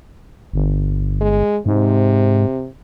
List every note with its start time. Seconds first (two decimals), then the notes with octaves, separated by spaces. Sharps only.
0.54 G1
1.21 G#3
1.66 G#2 C3